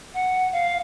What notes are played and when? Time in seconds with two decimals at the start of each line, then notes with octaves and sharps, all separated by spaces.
0.13 F#5
0.52 F5